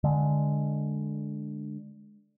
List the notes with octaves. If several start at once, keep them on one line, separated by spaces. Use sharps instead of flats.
D3 G#3